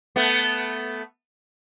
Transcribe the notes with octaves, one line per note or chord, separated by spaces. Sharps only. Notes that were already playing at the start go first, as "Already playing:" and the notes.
A3 B3